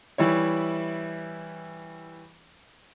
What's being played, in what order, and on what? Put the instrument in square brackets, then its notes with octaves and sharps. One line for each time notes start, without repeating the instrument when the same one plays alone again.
[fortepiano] E3 G3 E4 C#5